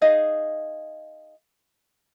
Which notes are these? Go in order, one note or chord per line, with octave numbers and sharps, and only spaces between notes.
D#4 G#4 D#5 F5